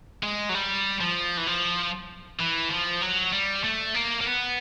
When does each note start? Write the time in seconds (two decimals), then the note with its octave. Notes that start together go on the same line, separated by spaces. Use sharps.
0.23 G#3
0.49 F#3
0.54 G3
1.00 F3
1.37 E3
1.47 F3
2.39 E3
2.71 F3
3.01 F#3
3.32 G3
3.64 A3
3.95 A#3
4.21 A#3
4.25 B3